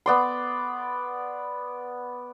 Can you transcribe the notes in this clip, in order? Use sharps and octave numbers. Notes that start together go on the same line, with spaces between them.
B3 D5 C6